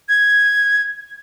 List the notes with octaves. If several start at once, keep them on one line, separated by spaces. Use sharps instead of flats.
G#6